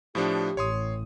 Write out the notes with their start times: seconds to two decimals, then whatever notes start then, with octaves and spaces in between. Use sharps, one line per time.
0.15 A2 F3 D4 G4
0.57 A1 C#5 C6 D#6